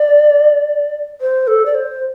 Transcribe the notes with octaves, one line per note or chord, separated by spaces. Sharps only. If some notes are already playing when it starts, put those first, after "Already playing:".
Already playing: D5
C5
A4
D5
C5